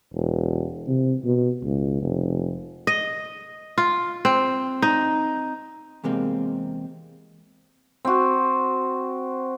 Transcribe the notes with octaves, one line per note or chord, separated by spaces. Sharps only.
E1
C3
B2
C#2
F1
D#5
F4
C4
D#4
E2 C3 G#3 A#3 C4
C4 F#4